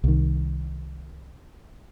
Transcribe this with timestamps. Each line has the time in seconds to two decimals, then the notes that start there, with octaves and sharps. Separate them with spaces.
0.04 C2 D#3